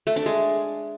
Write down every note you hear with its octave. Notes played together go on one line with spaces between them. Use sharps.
A3
D4
G#3